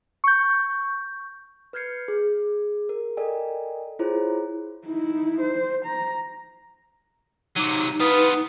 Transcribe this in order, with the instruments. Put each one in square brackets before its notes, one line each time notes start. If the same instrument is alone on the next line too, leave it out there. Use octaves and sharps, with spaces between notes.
[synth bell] C#6 G6
[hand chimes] B4 F6 G6 G#6 C7 C#7
G#4
A#4
A4 A#4 D5 D#5 G5 G#5
E4 F4 G#4 C5 C#5 A#5
[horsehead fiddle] D#4 E4
C5
A#5
[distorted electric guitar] C3 F#3 [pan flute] D#4 [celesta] D6 D#7
[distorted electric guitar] B3 F4 [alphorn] B4 [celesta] D#6